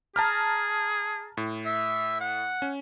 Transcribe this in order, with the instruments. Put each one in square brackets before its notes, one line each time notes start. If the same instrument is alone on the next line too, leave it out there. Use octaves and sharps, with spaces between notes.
[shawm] G#4 [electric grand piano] A5 A#5 F6
[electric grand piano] A2
[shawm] E5
F#5
[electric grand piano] C#4